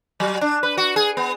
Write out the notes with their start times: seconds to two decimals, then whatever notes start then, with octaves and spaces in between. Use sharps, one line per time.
0.20 F#3
0.41 D4
0.63 B4
0.77 F#4
0.96 G#4
1.17 B3